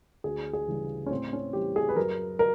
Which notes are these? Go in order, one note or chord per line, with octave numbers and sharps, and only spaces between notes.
D2 G#4
G#4
C#3 E3 G3
C#4
A2 C4
C#4
E3 G3 G4
G#4
B4
F#2 A#4
A#4